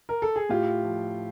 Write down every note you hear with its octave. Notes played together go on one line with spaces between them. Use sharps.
A#4
A4
G#4
A2 F4 G4
F3